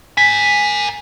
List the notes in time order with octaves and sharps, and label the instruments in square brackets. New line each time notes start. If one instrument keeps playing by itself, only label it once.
[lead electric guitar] A#4 G#5 [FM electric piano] B6